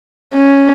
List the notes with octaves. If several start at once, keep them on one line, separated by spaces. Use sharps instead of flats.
C#4